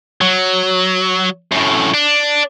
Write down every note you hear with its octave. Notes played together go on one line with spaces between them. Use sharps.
F#3
F#2 A2
D4